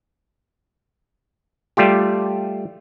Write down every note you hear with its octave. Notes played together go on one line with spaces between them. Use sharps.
G3 A3 F4 G4